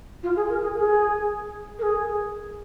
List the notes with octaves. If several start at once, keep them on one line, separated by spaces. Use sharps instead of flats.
F4
G#4
A#4
G#4
G#4
A#4
G#4